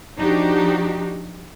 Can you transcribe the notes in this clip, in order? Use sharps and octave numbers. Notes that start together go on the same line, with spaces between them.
F3 D4 D#4 F#4 G4